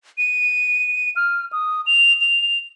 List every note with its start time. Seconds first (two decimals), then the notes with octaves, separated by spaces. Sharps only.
0.18 D#7
1.16 F6
1.53 D#6
1.86 F7
2.21 F7